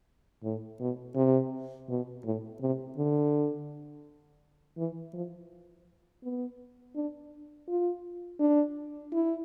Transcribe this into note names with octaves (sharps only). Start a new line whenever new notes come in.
A2
B2
C3
B2
A2
C3
D3
E3
F3
B3
D4
F4
D4
E4